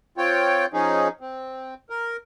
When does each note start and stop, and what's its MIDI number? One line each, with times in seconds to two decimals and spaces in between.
0.18 0.66 60
0.18 0.66 65
0.18 0.66 73
0.18 0.66 79
0.73 1.08 53
0.73 1.08 61
0.73 1.08 63
0.73 1.08 68
1.21 1.74 60
1.90 2.17 70